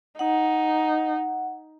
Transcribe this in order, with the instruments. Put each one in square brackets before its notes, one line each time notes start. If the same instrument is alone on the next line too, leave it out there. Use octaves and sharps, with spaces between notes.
[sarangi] D#4 [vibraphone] F#5